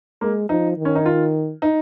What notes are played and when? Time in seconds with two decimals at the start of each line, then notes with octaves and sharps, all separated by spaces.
0.21 G#3 A#3
0.49 F3 D#4
0.78 D#3
0.85 C#4
0.95 D#4
1.06 F4
1.62 D#4